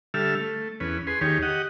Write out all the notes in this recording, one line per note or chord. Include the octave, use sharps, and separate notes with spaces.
D3 G3 A4 E5 F6
A3
E2 C#4 B4
G#4 B4 C6
D#2 D#3 G4 G#4 C#5
G4 D#5 F#5